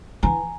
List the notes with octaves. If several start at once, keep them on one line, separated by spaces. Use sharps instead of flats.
E3 G#5 A#5